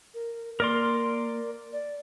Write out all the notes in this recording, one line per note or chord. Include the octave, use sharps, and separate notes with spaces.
A#4
A#3 A#4 D5 C6
D5